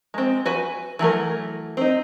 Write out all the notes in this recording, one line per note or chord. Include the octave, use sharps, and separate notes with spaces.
G#3 C4
F#4 B4 G#5
E3 F#3 A3 A#4
C4 D#4